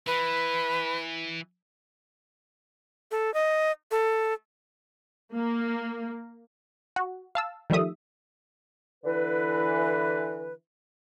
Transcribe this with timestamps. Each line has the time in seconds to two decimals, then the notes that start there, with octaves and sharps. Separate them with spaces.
0.07 E3 B4
3.11 A4
3.34 D#5
3.91 A4
5.33 A#3
6.96 F#4
7.35 F5 A5 E6
7.70 D#3 F3 G3 A3 E5 D#6
9.04 D3 E3 B4